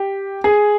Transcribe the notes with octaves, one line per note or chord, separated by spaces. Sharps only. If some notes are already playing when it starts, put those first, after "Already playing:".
Already playing: G4
G#4